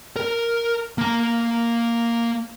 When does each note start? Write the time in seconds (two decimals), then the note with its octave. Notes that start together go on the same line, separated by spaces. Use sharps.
0.16 A#4
0.98 A#3 A#5